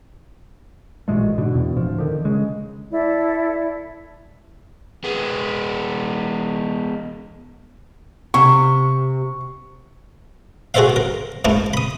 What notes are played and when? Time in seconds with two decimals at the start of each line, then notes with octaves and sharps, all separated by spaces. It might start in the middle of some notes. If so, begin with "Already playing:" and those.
1.08 A1 A#2 G#3 A3
1.38 G#2 B2 D3
1.54 E2 B2
1.74 D1 F3
1.98 D3 D#3
2.25 C#3 G#3
2.91 E4 A4 D5
5.04 G#3 B3
8.34 C3 C#6
10.74 F#4 G#4 A4 C5 E5 F5
10.96 A#4
11.45 G#2 A3 A#3 E4
11.74 B5 D#6